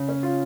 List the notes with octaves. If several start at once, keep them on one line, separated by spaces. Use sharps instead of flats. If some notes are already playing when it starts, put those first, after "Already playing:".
Already playing: C#3
C#4
F4